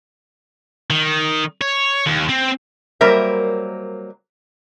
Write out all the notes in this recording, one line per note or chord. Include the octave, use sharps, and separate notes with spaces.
D#3
C#5
D#2
C4
F#3 G3 A#3 A#4 C5 E5